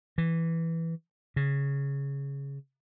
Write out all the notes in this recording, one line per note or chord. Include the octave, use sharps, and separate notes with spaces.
E3
C#3